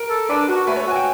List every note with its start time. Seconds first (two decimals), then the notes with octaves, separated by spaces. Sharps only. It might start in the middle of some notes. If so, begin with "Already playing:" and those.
Already playing: A#4
0.10 A4
0.29 D4 B4
0.49 F#4
0.67 A3 B4
0.76 C#5
0.87 F#4 G#5
0.96 G5